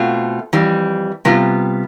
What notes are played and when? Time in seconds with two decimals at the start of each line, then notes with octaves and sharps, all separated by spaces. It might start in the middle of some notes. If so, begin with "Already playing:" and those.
Already playing: B2 A3 C4 F4
0.53 F2 E3 G3
1.25 C3 G3 B3 F4